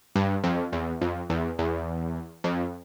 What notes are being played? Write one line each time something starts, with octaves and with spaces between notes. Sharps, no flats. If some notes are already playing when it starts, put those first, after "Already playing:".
G2
F2
E2
F2
E2
E2
F2